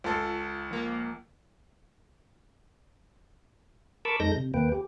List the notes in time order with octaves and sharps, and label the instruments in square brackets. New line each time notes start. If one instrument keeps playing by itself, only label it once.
[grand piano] C#2 A4 [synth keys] F4
[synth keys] F3 A#3
[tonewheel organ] A#4 A5 B5 C#6 D6 E6
F2 G#3 D#4 A4 G6 A#6
C3
D#2 A#3 B4 G5
G4